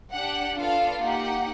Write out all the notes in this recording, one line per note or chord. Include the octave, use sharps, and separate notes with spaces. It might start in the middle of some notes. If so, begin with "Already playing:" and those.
D4 G4 F#5
B3 D4 F4 A4 F5
A#3 D#4 G4 F#5